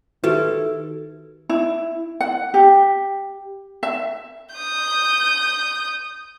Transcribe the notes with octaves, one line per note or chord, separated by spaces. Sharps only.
D#3 E4 F#4 G4 A4 B4
E4
F#5
G4
E5
D#6 G6